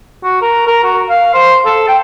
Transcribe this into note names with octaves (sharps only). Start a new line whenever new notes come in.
F#4
A#4
A#4
F#4
F5
C5
A4
G5